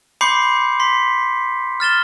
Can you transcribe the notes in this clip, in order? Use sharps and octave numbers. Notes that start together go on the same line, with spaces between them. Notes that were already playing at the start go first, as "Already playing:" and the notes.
B5 C6 D6 G6 C7 C#7
C6 B6
F6 A6 E7 G7